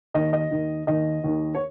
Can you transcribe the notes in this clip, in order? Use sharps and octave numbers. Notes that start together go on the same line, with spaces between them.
D#2 D#3 D#5
D#5
D#2 D#3
D#2 D#3 D#5
D#2 D#3
C#5